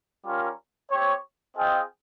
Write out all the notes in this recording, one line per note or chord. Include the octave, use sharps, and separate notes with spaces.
G3 C#4 F4 A#4
C4 G4 C#5
C4 F4 G#4 D#5 G5